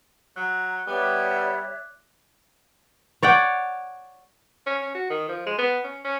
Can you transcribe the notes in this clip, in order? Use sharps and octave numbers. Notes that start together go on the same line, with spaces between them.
F#3 A#5 F#6
G3 B3 C#5 D5 E5 D6 F#6
C#5 D5 F#5 G5
C#4
C#4
F#4
D#3
F3
G#3
B3
C#4
C#4